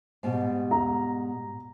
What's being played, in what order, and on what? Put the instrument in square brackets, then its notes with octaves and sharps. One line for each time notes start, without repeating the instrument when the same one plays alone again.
[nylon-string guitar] G#2 B2 G3
[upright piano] A#5